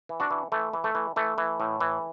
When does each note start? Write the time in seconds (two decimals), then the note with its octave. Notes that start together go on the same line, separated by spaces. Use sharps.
0.09 E3
0.20 D4 F#4
0.31 E3
0.52 E3 A3
0.73 E3
0.84 A3
0.95 E3
1.16 E3 A3
1.38 E3
1.60 A2
1.80 E3